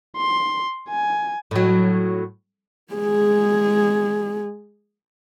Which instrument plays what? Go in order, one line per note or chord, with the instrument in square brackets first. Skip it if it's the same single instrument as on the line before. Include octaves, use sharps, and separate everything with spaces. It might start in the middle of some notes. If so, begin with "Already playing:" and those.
[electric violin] C6
G#5
[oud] A2 F#3
[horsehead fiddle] G#3 G#4